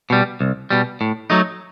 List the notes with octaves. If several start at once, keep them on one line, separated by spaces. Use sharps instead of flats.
B2 G3
C2
B2 G3
A2
F#3 A3 D#4